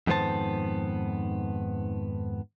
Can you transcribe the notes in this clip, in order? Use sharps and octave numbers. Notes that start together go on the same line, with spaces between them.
F2 G#2 D#3 B3 C5 A5